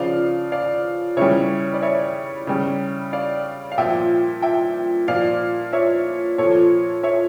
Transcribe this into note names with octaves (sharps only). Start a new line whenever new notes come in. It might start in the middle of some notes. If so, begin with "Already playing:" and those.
Already playing: C#3 F3 D5 F5
D5 F5
C#3 E3 G3 C#5 E5
D5
C#5 E5
C#3 G3
D5 F5
F5
A#2 F3 E5 G5
E5 G5
A#2 F3 D5 F5
C#5 E5
A#2 F3 A4 C#5
C#5 E5